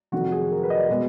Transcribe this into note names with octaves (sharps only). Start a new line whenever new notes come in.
F1 F2 D#3 F#3 F#4
G#4
A#4
B4
D#5
D5
B2 G#3 B3 B4